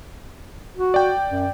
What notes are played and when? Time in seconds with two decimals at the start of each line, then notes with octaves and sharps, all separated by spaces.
0.77 F#4
0.94 D5 G5
1.28 F#2